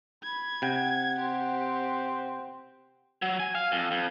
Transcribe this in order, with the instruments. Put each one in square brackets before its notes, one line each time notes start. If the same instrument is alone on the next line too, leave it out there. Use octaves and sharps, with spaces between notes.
[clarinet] B5 [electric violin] G#6
[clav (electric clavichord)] C3 G5 [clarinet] F#5
[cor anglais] C4 [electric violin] G4
[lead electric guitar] F#3
G#5
F5
F2
F2